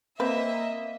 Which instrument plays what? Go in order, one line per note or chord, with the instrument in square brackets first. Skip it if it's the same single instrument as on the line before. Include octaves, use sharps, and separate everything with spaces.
[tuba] A#3 [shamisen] C4 B4 [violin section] D#5 E5